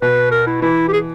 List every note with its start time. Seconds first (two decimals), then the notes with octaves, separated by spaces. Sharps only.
0.02 B2 B4
0.31 A#4
0.47 E4
0.62 E3 E4
0.88 G4
0.93 G#4